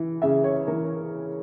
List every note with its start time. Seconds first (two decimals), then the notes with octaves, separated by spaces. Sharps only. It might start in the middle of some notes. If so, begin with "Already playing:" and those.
Already playing: E3
0.22 C#3 E5
0.44 C#5
0.67 E3 A#4